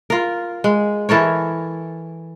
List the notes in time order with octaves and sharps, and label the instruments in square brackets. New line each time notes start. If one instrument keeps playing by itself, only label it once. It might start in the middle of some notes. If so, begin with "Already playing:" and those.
[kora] F4 A#4
G#3
E3 A4 A#4 C#5